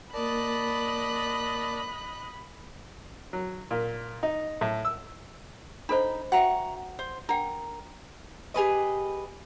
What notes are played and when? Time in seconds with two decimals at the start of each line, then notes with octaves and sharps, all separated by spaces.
0.14 A#3 A#4 D5 D#5 A5 B5 F#6
3.33 F#3
3.71 A#2
4.23 D#4
4.61 A2
4.85 E6
5.89 D4 D#4 A4 C5 B5
6.32 F#4 E5 F#5 G5 A#5 C#6
6.99 C5
7.29 D4 A#4 F#5 G5
8.54 G4 G#4 B4 D#5